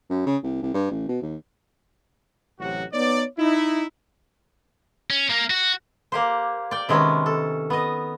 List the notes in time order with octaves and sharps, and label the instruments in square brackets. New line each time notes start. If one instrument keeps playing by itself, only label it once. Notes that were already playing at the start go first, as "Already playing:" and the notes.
[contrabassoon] F#2
C#3
C2
C2
G2
A1
B2
D#2
[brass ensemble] A1 C3 F#3 F#4
B3 D#4 C#5 D5
D#4 E4
[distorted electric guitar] C#4
A#3 A#4
F#4
[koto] A#3 G4 C5
D5 G5
C3 D#3 G#3 B3 C#4
A4
B3 D#5